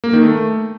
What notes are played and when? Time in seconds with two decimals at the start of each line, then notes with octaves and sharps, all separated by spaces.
0.04 A#3
0.13 D#3
0.23 A3